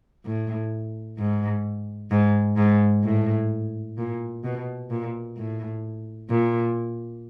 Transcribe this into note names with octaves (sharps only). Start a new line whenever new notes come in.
A2
G#2
G#2
G#2
A2
A#2
B2
A#2
A2
A#2